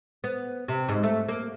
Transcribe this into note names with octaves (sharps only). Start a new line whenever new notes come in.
B3
C3
G#2
A3
A#3